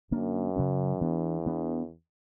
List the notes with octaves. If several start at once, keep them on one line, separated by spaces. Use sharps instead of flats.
F#2 D3 A#3 D4
C#3 F#3 C#4
E2 E3 B3 D4
E3 B3 D4